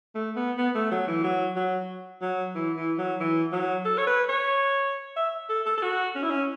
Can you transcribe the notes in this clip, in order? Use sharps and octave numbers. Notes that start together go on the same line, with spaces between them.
A3
B3
B3
A3
F#3
E3
F#3
F#3
F#3
E3
E3
F#3
E3
F#3
A4
C#5
B4
C#5
E5
A4
A4
A4
F#4
C#4
E4
C#4